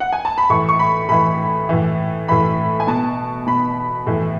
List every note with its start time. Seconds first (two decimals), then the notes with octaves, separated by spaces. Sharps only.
0.00 F#5
0.12 G#5
0.25 A5
0.38 B5
0.49 A2 E3 C#6
0.69 C#6
0.79 B5
1.09 A2 E3 B5
1.69 A2 E3
2.28 A2 E3 B5
2.80 G#5
2.87 B2 A5
3.47 B2 B5
4.07 A2 E3